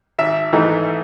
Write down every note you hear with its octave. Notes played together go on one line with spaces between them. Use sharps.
G#1 E5
G#2 E3 A3 D#4